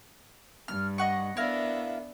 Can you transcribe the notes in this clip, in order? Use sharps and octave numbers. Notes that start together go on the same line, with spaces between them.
G2 F6
D#5 F#5 C#6
B3 D4 E4 A#4 E5 F5